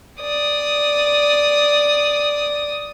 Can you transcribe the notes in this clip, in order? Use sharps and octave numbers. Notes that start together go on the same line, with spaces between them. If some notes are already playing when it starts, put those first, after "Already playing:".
D5 D#6